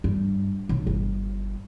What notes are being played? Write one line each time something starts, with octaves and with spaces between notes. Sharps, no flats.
G2
B1
G1